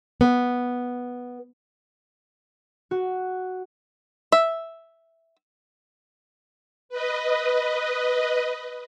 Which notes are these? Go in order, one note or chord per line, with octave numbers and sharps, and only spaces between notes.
B3
F#4
E5
B4 D#5